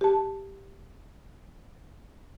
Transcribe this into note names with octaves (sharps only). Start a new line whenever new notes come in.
G4 A5